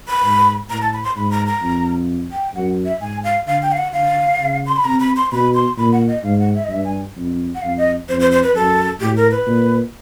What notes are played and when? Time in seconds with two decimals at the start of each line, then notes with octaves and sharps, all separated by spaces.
0.08 B5
0.24 G#2
0.69 A2 A#5
0.82 A5
0.93 B5
1.04 C6
1.16 G#2 B5
1.31 A#5
1.47 A#5
1.62 F2
2.32 G5
2.55 F#2 F#5
2.86 E5
3.01 G#2 G#5
3.24 F5
3.47 D3 F5
3.62 G5
3.72 F5
3.77 F#5
3.93 D3 F5
4.40 C#3
4.66 C6
4.76 B5
4.85 C3 A#5
5.00 B5
5.16 C6
5.32 B2 B5
5.54 C6
5.78 A#2 B5
5.93 F#5
6.08 D#5
6.24 G#2 F5
6.40 F#5
6.55 E5
6.64 D#5
6.70 G2 E5
6.85 G#5
7.16 F2
7.55 F#5
7.62 F2 F5
7.78 D#5
8.09 F2 C5
8.20 C5
8.31 C5
8.43 B4
8.55 F#2 A4
9.00 A2 G4
9.16 A#4
9.31 B4
9.47 A#2